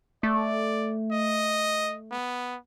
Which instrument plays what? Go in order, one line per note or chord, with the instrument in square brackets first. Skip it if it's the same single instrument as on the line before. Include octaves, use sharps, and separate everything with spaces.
[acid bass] A3 [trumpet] D5
[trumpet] D#5
B3